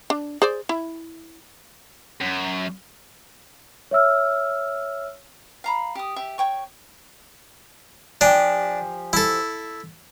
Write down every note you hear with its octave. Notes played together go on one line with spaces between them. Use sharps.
D4
G#4 C5 D5
E4
F#2
C#5 E5 E6 F6
F5 A#5 B5
G4 D#6
G4 E5
C#5 G5 C#6
F3 D4 G4 G#5
E4 A4